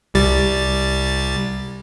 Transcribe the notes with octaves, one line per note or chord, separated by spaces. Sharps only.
C2 G3 A6